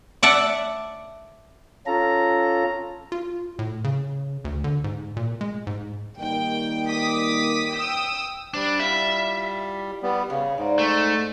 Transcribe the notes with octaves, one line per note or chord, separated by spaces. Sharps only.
D5 E5 F#5 A5
C#4 F4 A4 A#5
F4
A2
C#3
D2
D3
G#2
A#2
G#3
G#2
D#3 G3 A#3 G5
D6 D#6 B6
G5 D#6 E6
G3 D4 C5
E4 F4 E5 F#5
G3 B3
C#3 B3
G#2 D5
A3